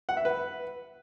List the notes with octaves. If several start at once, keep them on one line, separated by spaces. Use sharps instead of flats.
F#5
E5
B4